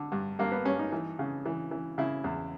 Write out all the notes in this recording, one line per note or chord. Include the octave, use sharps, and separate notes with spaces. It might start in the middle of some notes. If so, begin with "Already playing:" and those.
Already playing: D3
G2
G2 A#3
B3
G2 C#4
D#4
E3
C#3
E3
E3
C#3 E4
E2